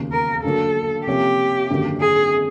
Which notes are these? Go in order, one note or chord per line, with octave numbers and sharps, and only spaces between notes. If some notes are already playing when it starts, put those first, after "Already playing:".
Already playing: E1 D#2 C#3
A#4
G2 D3 F#3 A#3 A4
C3 F3 A#3 C#4 G4
G#1 F#2 D3 F#3 A#3
G#4